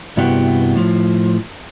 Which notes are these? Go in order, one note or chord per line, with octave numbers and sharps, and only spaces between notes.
G2 C3 B3 E4 F#4 G4
A2 F3